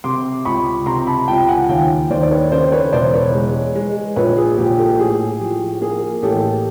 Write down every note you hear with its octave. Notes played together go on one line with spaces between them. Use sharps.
C3 C6 D6
C#2 B5 C#6
C3 A#5 C6
A5 B5
C#2 G5 A5
F#5 G#5
D#2 F5 G5
D#2 C5 D5
D5
B4 C#5
C#3 C5 D5
B4 C#5
E1 C5 D5
B4 C#5
G#3
G#3
A#1 B4 C#5
G#4
A#1 G4
G4 A4
A2 G#4
F3 G4
A#3 G#4
A1 G4 A4